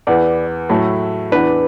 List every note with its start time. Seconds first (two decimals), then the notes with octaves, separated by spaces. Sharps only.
0.07 E2 E3 B3 D5
0.69 A2 F#3 A3 E4 A4
1.32 E2 E3 B3 D4 B4